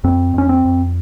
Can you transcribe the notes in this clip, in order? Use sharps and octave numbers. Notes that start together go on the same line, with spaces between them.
F2 C4
F2 C#4
C4
F2